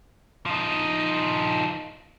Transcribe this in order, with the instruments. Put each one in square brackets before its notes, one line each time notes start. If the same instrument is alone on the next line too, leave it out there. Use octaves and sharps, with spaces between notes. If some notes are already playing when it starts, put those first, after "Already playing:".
[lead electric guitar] F3 D#4